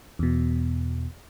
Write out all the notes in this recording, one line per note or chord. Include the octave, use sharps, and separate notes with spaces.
E2 B2